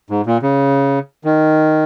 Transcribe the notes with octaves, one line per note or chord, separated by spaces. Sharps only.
G#2
A#2
C#3
D#3